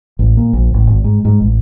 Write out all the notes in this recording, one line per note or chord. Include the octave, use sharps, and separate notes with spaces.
A1
A#2
A#1
A1
G#1
G#2
G#2
A1